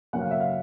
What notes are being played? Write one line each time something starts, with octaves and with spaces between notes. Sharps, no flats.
C#3 F#3 A#3 C#4 F#5
F5
E5
F5